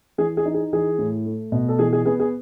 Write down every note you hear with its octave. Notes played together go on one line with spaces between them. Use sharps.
E3 G#4
G#4
D#4
G#4
E3 G#4
A2
A3
B2
A4
E3 G#4
G#4
B3 G#4
G#4